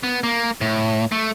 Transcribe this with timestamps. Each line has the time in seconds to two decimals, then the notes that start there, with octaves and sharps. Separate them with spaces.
0.03 B3
0.23 A#3
0.61 A2
1.12 A3